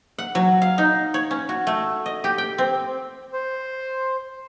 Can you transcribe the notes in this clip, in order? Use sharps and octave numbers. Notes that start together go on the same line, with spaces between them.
F#5
F#3
F5
D#4
C#5
C#4
F#4
A3
D#5
G4
G5
C4
C5